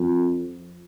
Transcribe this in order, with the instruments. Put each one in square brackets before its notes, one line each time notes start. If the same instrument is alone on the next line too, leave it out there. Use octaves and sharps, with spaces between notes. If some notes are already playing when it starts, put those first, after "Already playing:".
Already playing: [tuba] F2